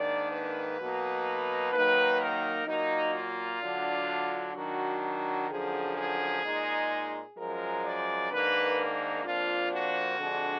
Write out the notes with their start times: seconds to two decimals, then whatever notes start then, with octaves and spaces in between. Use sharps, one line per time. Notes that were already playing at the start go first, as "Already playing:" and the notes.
Already playing: G#2 D#3 A#3 D4 D5
0.32 B4
0.79 B2 F#3 A#3 D#4
1.73 D#3 F#3 A#3 D#4 B4
2.21 A#4
2.67 A#2 F#3 A#3 D#4
3.14 F4
3.62 D3 F#3 D4
4.55 D#3 F#3 D4 F#4
5.02 F#4
5.50 F#2 D3 F3 G#4
5.97 G#4
6.43 A#2 G#3 D#4
7.37 F#2 F3 G#3 A#4
7.85 D5
8.31 G#2 D#3 A#3 D4 B4
8.79 D#4
9.25 F2 F3 A#3 D4 F4
9.73 F#4
10.20 F2 D3 G#3 D4